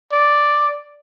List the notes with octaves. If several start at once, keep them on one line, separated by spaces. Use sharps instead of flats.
D5